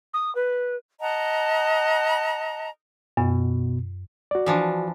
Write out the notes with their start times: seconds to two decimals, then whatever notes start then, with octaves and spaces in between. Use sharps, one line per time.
0.13 D#6
0.35 B4
1.01 D#5 F#5 A5 A#5
3.17 F#2 B2
4.31 F#4 D5
4.46 E3 F3 D4